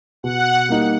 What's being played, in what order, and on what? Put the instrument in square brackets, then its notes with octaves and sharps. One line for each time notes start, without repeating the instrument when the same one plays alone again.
[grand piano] B2 [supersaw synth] F#5
[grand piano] G3 A#3 D#4